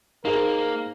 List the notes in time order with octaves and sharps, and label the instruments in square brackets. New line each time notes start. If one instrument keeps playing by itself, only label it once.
[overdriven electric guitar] A#3 [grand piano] D#4 G#4 C5 [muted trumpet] A#4